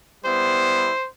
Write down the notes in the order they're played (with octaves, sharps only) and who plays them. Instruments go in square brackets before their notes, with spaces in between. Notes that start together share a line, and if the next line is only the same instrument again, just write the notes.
[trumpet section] G3 B3 E4 C5